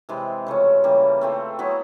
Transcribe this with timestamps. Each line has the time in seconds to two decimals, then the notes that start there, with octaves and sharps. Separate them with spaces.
0.09 C3 E3 G#3 C4
0.47 C#3 F3 A3 C#4
0.84 C#3 E3 G3 A#3
1.21 A3 C4 F4
1.59 F#3 B3 E4 G#4